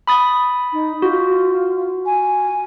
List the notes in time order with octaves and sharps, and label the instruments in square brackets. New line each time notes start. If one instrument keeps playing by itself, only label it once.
[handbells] B5 D#6 A6
[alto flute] D#4
[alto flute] F4 [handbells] F#4
[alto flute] G#5